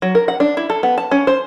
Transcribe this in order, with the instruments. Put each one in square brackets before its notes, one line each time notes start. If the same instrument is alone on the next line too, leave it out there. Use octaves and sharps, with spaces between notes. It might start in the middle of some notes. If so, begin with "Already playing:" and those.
[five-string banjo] F#3
A#4
F#5
D4
E4
A4
B3
A5
C#4
C5